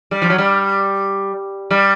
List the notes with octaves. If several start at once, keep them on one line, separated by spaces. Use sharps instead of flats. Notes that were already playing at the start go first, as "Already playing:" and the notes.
G3
F3
F#3
G3
G3